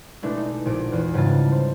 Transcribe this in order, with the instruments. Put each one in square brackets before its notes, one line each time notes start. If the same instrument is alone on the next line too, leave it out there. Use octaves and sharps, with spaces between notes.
[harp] B2 G#3 A3 D4 E4
D#4
A#1 A#2 D7
E2
G#2 C#3 G3 F4 A5
C5